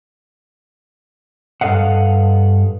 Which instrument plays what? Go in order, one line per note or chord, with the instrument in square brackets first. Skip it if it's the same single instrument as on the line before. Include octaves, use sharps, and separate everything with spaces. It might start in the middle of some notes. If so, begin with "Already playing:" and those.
[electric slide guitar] G2 A4 D#5 F5 F#5